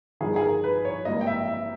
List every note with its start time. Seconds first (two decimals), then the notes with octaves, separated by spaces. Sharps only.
0.21 G1 G2 D#3 G#4
0.36 G#4
0.41 A#4
0.64 B4
0.85 C#5
1.05 G#1 G2 E3 A#3 D#5
1.21 G5
1.27 E5
1.48 E5